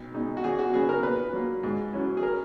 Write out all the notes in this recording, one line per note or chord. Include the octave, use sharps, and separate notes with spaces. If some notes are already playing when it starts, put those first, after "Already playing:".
Already playing: B1
B2 G#3 D#4
F#4
E2 G#4
F#4
C#3 F#3 B3 G#4
A#4
A#2 B4
F#3 A#3
G#2
F#3 C#4 E4
G#4
A#4